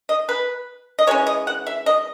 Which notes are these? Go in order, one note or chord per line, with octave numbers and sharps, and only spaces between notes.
D#5
B4
D#5
E3 G#3 C#4 C#5
D#5
F#5
E5
D#5